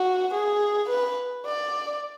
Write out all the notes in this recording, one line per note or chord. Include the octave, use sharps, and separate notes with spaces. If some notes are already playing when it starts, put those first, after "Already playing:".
Already playing: F#4
G#4
B4
D5